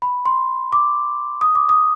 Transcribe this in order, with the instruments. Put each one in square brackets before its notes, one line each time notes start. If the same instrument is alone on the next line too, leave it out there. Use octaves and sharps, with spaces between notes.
[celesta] B5
C6
D6
D#6
D6
D#6